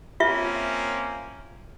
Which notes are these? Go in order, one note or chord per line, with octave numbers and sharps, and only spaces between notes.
A#3 C4 C#4 F4 E5